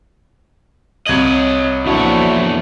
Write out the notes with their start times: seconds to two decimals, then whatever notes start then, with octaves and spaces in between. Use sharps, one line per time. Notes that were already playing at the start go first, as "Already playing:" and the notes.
1.06 C2 C#5 D#5 G#6 F#7
1.86 E2 A#2 F3 A3 D4 E4 F#4 C#5